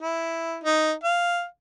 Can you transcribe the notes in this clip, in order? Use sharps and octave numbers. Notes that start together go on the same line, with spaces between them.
E4
D#4
F5